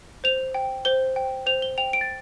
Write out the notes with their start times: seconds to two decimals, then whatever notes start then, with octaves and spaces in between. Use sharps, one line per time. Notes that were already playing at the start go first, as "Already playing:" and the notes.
0.24 C5 F7
0.54 G5
0.85 C5 G7
1.16 G5
1.46 C5 F7
1.62 G7
1.78 G5 F7
1.93 D7
2.01 A6